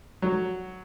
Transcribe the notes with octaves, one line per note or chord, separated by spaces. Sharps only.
F#3